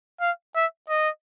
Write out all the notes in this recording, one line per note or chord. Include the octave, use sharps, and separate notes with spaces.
F5
E5
D#5